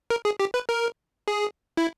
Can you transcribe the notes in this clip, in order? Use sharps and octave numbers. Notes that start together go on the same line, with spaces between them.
A#4
G#4
G4
B4
A#4
G#4
E4